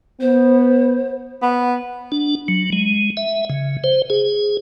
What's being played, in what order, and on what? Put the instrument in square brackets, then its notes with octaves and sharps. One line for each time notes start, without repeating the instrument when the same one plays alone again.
[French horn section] B3 [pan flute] C5
[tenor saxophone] B3
[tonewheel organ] D4
F#3
G#3
E5
C#3
C5
G#4